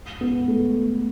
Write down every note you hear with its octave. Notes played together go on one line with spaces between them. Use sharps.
B3
A3